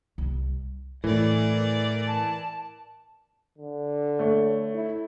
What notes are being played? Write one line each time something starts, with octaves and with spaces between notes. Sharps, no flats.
C2
A2 E3 A#4 D5
A5
D3
A3 C#5
E4